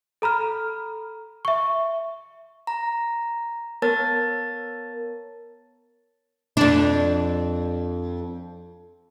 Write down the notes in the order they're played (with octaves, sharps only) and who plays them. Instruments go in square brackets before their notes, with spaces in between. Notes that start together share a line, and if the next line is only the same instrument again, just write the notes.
[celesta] A4 A#5 B5 F6
E5 C#6
[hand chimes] A#5
B3 A#4 C#5 A5 A6
[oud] F2 D4